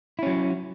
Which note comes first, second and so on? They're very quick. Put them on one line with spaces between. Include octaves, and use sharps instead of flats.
E4 C#4 F#3